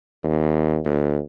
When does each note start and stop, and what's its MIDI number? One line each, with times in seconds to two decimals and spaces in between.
0.24 0.79 39
0.85 1.20 38